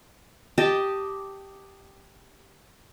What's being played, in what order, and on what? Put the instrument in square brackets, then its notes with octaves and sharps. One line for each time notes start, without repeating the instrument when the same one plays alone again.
[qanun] G4 D#5 A5